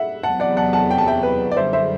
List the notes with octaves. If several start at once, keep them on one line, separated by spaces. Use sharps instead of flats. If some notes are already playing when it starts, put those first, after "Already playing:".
Already playing: E5 F#5
E2 C3 F#3 B3 F#5 A5
D5 F#5
F#5 A5
F#5 A5
G5
A5
E5 G5
B4
D5
F#2 D3 G3 C5 E5
C5 E5